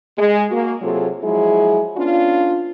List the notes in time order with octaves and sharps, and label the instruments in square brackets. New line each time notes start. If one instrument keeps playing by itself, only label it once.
[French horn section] G#3
A#3 F#4
C3 F#3 F4 G#4 A4
F3 F#3 G#3 E4 G#4
B3 C#4 D4 F4